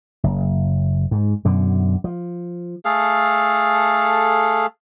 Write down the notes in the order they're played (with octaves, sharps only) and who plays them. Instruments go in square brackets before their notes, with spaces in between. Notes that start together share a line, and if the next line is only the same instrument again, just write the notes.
[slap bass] F#1
G#2
F#2 B2 D3
F3
[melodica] A3 G#4 A4 F5